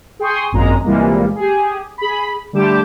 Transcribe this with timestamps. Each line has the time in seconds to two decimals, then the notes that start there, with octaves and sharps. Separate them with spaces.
0.19 G#4 G5 C6 C#6 D#6
0.52 G#1 F#2 A#2 G#3 A#5
0.84 C2 A#2 E3 G3 G#3 A#3
1.35 G4 G#4
1.98 G#4 B5
2.53 D3 G3 A3 G4 D6 E7